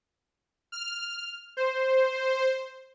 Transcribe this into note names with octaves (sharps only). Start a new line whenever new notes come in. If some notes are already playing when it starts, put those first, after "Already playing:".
F6
C5